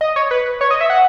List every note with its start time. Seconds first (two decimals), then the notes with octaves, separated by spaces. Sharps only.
0.01 D#5
0.16 C#5
0.31 B4
0.61 C#5
0.71 D#5
0.81 E5
0.90 F#5